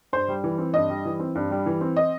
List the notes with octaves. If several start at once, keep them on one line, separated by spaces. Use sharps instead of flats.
G2 C5
G3
E3
C4
G2 D#5
G3
E3
C4
G2
G3
E3
C4
D#5